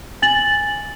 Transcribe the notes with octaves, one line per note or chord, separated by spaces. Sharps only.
G#5 A6 F#7